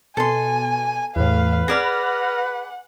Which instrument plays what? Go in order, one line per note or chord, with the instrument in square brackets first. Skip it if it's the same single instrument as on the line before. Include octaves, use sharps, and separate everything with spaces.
[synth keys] B2 [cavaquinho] A4 C6 [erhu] G#5
[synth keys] E2 A2 [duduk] B4 [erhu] F5
[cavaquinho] G#4 D5 B5 [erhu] F#5 [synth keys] F6 A#6